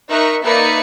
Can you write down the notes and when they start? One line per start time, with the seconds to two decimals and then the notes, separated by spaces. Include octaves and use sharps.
0.10 D#4 A#4 E5 C#6 F#6
0.44 A#3 D#4 B4 D5 E5 C#7